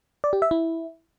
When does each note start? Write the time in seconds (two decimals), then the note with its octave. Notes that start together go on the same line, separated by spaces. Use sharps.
0.24 D5
0.33 G4
0.42 E5
0.51 E4